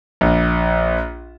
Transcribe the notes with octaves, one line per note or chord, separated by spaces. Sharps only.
A#1